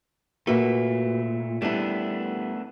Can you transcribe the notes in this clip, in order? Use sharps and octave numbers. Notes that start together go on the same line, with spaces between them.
A#2 A3 A#3 F#4 B4
G3 A3 B3 D4 E4